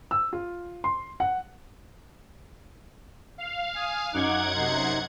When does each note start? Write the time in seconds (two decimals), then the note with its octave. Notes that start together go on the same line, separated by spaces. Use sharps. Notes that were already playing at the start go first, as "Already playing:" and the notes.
0.11 E6
0.33 F4
0.84 C6
1.20 F#5
3.38 F5
3.75 G#5 D#6
4.14 F#2 D#4 F#5 D6 F#6 G#6
4.56 C3 D#4 C6